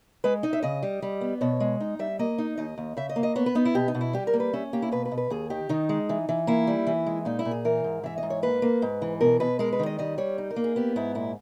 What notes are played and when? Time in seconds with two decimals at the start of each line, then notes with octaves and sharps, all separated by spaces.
0.24 G#3 B4
0.43 D#4 D#5
0.53 E5
0.63 C#3 D#5
0.83 G3
1.02 G3
1.21 B3
1.41 B2 C#5
1.60 G#3
1.80 D#4
1.99 G3 E5
2.19 A#3 D#5
2.38 D#4
2.57 D#2 D#5
2.78 D#2
2.97 C#3 E5
3.09 D#5
3.16 A#3
3.23 D#5
3.36 B3 C#5
3.46 B4
3.55 B3 D#4
3.65 E4
3.75 B2 G4
3.88 D#4
3.95 B2
4.01 E4
4.13 G3 G4
4.27 A#4
4.33 A#3
4.40 B4
4.53 C#4 E5
4.73 A#3 G4
4.82 E4
4.92 B2 B4
5.05 B4
5.11 B2
5.17 B4
5.30 D#2 G#4
5.50 D#3 G4
5.69 D#3 D#4
5.89 G#3
6.09 E3
6.29 E3
6.47 A#3 E4
6.67 G3
6.87 E3
7.06 G#3
7.25 A#2 D#4
7.39 E4
7.45 A#2
7.51 G#4
7.65 E3 A#4
7.84 G#2
8.04 E3 E5
8.18 D#5
8.23 G#2
8.30 C#5
8.43 A#3 B4
8.62 A#3
8.82 G#2
9.02 E3
9.21 B2 A#4
9.40 B2 B4
9.59 G#3 A#4
9.73 B4
9.79 D#3
9.86 D#5
9.98 G3 D#5
10.18 G3 C#5
10.38 D#4
10.50 A#4
10.56 A#3
10.64 G#4
10.76 B3 G4
10.96 G#2 E4
11.15 A#2 E4